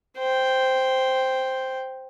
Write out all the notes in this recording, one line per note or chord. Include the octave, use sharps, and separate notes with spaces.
C5 G5